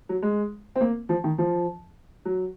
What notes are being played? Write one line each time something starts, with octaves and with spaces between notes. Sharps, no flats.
F#3
G#3
C4
A#3
F3
D#3
F3
F#3